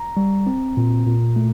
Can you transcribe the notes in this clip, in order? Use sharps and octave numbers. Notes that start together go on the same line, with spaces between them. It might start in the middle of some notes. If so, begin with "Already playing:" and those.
Already playing: A#5
G3
C4
A#2
A#2
A3